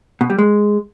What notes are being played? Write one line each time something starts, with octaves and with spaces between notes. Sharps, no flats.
B2
G3
G#3